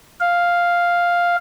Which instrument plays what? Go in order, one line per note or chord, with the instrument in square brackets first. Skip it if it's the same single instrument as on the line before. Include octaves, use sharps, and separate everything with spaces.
[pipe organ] F5